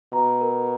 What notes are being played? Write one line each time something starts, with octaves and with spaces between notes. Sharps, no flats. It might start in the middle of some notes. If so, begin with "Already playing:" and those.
B2 A#5
A#4